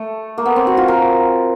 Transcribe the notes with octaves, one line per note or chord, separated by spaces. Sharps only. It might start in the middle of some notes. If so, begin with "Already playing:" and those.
Already playing: A3
A#3
B3
C4
F#4
F4
A#4